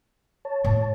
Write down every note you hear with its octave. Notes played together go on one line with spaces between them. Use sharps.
C#5 A5
A2 A3